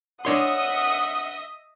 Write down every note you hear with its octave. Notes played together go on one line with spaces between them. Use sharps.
D4 C#5 D#5 E5 F#5 C6 D#6